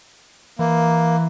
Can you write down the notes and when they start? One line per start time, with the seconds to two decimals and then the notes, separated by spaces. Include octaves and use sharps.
0.59 E3 A#3